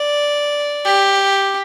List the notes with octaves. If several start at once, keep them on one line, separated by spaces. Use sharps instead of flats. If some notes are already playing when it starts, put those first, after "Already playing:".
Already playing: D5
G4